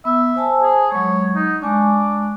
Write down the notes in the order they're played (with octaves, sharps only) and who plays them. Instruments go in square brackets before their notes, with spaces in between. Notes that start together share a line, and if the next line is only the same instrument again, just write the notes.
[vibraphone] B3 [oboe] E5
[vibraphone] C5 G#5 A5
[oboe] G#4
[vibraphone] F#3 G#3 [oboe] C#5
[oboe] D#4
[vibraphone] G#3 G#5 C#6 [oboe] D4